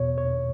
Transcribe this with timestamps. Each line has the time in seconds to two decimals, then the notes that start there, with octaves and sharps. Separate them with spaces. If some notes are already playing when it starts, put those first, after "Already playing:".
Already playing: E2 B2 C#5
0.18 C#5